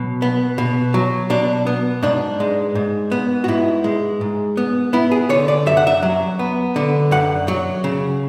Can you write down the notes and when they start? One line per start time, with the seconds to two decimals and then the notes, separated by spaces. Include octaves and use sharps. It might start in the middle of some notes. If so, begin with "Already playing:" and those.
Already playing: B2 F#3
0.22 B3
0.58 B2
0.94 F#3
1.30 B2 D4
1.67 B3
2.03 G#2 D4
2.40 G#3
2.75 G#2
3.11 B3
3.44 F#4
3.48 G#2 E4
3.84 G#3
4.21 G#2
4.57 B3
4.93 B3 E4
5.12 G#4
5.29 D3 C#5
5.48 D5
5.66 F#2 E5
5.77 F#5
5.87 E5
6.03 F#3
6.39 B3
6.76 D3
7.11 F#2 F#5
7.48 F#3
7.84 C#3